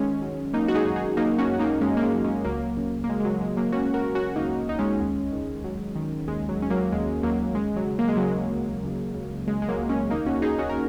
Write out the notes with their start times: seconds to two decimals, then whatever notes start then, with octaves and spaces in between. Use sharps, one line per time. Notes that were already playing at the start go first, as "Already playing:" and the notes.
Already playing: D#3 G#3 C#4
0.22 F#3
0.53 F#3 A#3 D#4
0.68 F#4
0.75 D#4 G#4
0.85 F#2
0.96 D#4 G#4
1.17 F#3 A#3 D#4
1.38 C#4 F#4
1.49 F#2 F#4
1.59 A#3 D#4
1.81 F#2 G#3 C#4
1.97 A#3
2.03 G#3 C#4
2.13 F#3
2.24 G#3 C#4
2.44 C#2 F#3 A#3
2.77 C#3
3.04 A#3
3.08 F#3 G#3
3.20 G#3
3.25 F#3
3.40 C#2 G#3
3.57 F#3 A#3
3.72 F#3 C#4 F#4
3.94 F#4 A#4
4.05 F#3
4.15 C#4 F#4
4.36 C#2 A#3 D#4
4.69 C#2 D#4
4.79 G#3 C#4
5.00 D#2
5.32 D#3
5.64 F#3
5.96 D#3
6.28 D#2 G#3
6.49 F#3
6.60 F#3
6.62 C#4
6.70 F#3 A#3
6.92 D#2 G#3
7.23 D#2 F#3 A#3
7.55 C#3 G#3
7.76 F#3
7.87 C#3
7.99 A#3
8.08 G#3
8.17 C#3 F#3
8.27 G#3
8.51 C#2
8.84 C#2
9.14 C#3
9.47 C#3 G#3
9.62 G#3
9.68 F#3 A#3
9.78 C#2
9.89 G#3 C#4
10.10 D#2 A#3 D#4
10.26 C#4 F#4
10.42 D#2 D#4 G#4
10.58 C#4 F#4
10.69 A#4